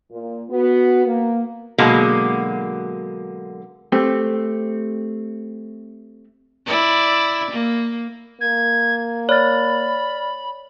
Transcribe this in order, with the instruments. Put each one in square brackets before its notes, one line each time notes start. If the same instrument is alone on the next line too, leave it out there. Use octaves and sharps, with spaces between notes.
[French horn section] A#2
B3 F#4
A#3
[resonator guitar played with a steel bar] B2 D3 F#3 G#3 A#3
[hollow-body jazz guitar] A3 C4 G4
[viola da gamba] E4 D5
A#3
[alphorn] A#3 [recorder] G#6
[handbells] C#5 [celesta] D5 F6 A6 [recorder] B5